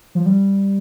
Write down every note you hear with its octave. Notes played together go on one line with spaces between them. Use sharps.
F3
G3